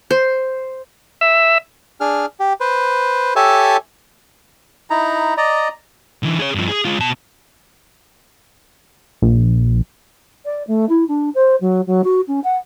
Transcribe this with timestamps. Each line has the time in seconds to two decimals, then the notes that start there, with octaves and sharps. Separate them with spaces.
0.11 C5
1.21 E5
2.01 D4 G#4 F6
2.40 G4
2.60 B4 C5
3.36 G4 A4 C#5 E5 G#5 A5
4.90 D#4 E4 A#5
5.37 D5 D#5 A#5
6.23 D3 E3
6.39 G#4 C#5
6.55 G2 F3
6.69 G#4
6.85 G#3 F4
7.00 B2 A5
9.22 A#1
10.45 D5
10.67 A3
10.89 E4
11.08 D4
11.35 C5
11.61 F#3
11.87 F#3
12.04 F#4
12.28 C#4
12.44 F#5